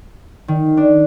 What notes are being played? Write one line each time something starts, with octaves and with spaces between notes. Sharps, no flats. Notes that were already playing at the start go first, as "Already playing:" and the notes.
D#3
D4